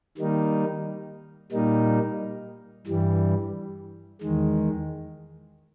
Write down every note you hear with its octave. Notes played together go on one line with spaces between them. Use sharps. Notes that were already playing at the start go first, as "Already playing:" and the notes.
D#3 G3 A#3 D#4
A#2 G3 A#3 D#4
G2 E3 G3
E2 D#3 G#3